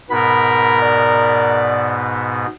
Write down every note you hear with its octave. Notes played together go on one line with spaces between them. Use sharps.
G#2 B2 B3 A#4 B5
D5